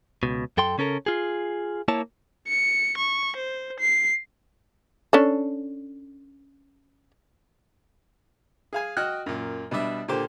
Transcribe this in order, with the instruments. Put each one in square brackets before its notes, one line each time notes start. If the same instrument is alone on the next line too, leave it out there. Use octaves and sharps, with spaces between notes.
[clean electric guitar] C#2 B2
F#2 A4 G5 C6
C#3 C#4 A4 A#4
F4 G#4
A#3 E4 C#5 A5
[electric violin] C#7
C#6
C5
C7
[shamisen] C#4 D4 A4
[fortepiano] G#4 F5 G#5
F#4 D#5 G5 F6 F#6
F#2 A#2
B2 G3 D4 E5
A#2 D3 G4 C5